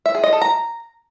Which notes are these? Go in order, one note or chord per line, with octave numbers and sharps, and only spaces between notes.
E5
G#4
D#5
A4
A#5